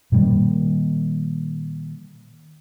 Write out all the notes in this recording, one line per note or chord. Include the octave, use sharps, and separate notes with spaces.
A#2 D#3 G3 A#3